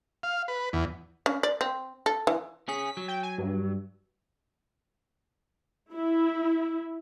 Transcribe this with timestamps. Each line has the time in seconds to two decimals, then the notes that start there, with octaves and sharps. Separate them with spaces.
0.23 F5
0.48 B4
0.73 E2
1.26 C#4
1.43 D5
1.61 C4
2.06 A4
2.27 E3
2.68 C#4 G#4 B6
2.97 F#3
3.08 G5
3.23 G#5
3.38 G2
5.92 E4